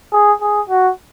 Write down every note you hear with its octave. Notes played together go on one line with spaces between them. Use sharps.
G#4
G#4
F#4